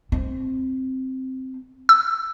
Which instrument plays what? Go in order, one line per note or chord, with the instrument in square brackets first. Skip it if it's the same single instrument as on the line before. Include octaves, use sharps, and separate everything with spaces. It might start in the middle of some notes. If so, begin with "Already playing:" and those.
[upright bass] C4
[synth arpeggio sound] E6